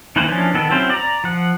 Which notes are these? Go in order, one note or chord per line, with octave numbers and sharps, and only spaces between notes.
D#3 E3 A#3 B4 C5
E3 F3 C#4 D4
D#3 B3 A4
F#3 C4 C#4 E4 C5
D5 A#5
F3 F#5